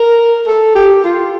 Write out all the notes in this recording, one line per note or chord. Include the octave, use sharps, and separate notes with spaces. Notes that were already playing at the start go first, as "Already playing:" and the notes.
Already playing: A#4
A4
G4
F4